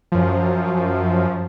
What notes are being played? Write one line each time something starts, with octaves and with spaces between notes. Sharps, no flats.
F#2 F3